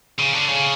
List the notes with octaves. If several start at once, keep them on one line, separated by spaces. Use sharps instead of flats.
C#3
D3
C#3